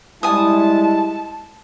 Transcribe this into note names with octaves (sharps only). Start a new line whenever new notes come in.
G3 G#3 E4 G#5 A5 D#6